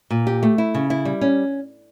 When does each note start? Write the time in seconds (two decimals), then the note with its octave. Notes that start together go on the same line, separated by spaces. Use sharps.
0.10 A#2
0.27 G4
0.43 A3
0.58 E4
0.74 C#3
0.90 E4
1.05 G3
1.21 C#4